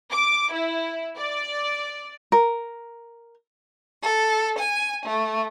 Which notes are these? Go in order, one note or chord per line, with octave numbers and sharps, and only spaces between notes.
D6
E4
D5
A#4
A4
G#5
A3